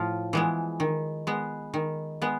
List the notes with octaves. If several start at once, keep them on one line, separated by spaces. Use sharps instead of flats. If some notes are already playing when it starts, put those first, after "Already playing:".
Already playing: A2 F3 F4
E3 G#3 B3
D#3
G#3 B3
D#3
G#3 B3